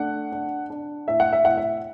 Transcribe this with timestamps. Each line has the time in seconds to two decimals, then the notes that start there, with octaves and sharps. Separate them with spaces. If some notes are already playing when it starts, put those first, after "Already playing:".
Already playing: A3 D4 F#5
0.32 D4
0.70 D4
1.08 A2 E5
1.20 F#5
1.33 E5
1.45 A2 F#5
1.57 E5